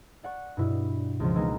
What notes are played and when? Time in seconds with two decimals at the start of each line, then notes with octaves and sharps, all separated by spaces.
0.24 D5 F#5 C#6
0.57 G2 B2 E4
1.20 C#2 F3
1.35 E3 G#3 A#3 B3 D#4